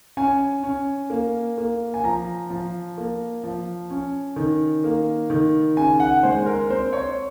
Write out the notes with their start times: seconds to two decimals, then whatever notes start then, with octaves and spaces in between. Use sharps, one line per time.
0.17 C#4 G#5
0.63 C#4
1.10 A#3
1.58 A#3
1.94 G#5
2.03 F3 A#5
2.50 F3
2.98 A#3
3.44 F3
3.90 C#4
4.36 D#3
4.84 A#3
5.30 D#3
5.77 C#3 G#5
6.00 F#5
6.23 G#3 C5
6.46 A#4
6.70 C4 C5
6.93 C#5